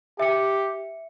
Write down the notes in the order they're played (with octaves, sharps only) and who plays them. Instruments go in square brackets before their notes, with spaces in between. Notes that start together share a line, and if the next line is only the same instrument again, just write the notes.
[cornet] G4 [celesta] E5 C#7